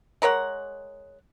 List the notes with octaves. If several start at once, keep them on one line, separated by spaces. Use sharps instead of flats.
G#3 A#4 C#5 F#5